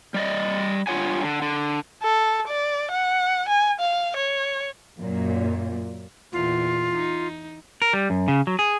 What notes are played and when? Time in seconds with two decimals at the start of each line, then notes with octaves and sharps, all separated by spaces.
0.14 G3 D5 D#5
0.87 G2 A3 F4 C#5 F#5 G#5
1.24 D3
1.42 D3
2.03 A4
2.48 D5
2.91 F#5
3.49 G#5
3.80 F5
4.17 C#5
4.98 F#2 A#2
6.33 E2 A#2 F4
6.95 D#4
7.82 A#4
7.93 G3
8.10 F#2
8.28 C#3
8.47 F#3
8.59 G#4